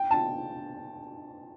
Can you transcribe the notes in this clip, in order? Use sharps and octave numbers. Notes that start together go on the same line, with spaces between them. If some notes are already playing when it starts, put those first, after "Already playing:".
Already playing: G5
A5